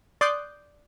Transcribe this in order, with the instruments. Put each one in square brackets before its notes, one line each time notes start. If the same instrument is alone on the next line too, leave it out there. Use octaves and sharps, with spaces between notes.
[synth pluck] D5 C6 D#6 F#6 G6